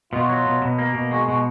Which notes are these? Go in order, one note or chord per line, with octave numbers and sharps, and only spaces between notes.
B2 F4
F#4
F#3 F4
B2
B2
A#3
B2
G#3 F#4
B2 F#4